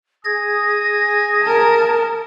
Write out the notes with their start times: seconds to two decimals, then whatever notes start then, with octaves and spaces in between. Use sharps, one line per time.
0.25 G#4 G#5 D#6 G#6 A#6
1.43 A#4 A5